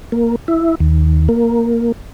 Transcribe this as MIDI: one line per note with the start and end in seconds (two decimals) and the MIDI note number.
0.12 0.36 58
0.48 0.75 64
0.80 1.28 39
1.29 1.92 58